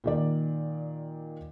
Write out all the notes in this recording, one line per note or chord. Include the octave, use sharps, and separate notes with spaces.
A#2 D#3 D5